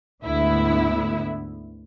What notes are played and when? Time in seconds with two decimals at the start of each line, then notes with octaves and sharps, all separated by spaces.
0.23 D2 G#2 D3 B3 E4 E5